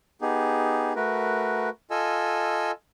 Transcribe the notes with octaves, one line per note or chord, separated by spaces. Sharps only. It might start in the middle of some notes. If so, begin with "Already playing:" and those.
B3 D#4 G4 G#4
A3 F#4 A#4 B4
F4 A4 D#5 G#5 E6